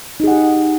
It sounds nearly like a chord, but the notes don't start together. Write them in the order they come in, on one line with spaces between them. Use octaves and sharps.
D#4 G#4 F#5 G4